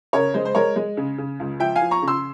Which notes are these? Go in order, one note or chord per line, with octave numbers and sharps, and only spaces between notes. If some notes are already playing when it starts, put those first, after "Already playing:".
C#3 A#4 C#5
G#3 C5
C5
G#3 A#4 C#5
G#3
C#3
C#3
C#2
F3 E5 G5
F5 G#5
F3
A#5 C#6
C#3
C6 E6